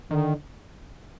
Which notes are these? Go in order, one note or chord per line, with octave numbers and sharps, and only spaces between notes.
D3 D#3